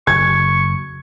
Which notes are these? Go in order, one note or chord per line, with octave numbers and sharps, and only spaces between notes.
F#1 C#6 G#6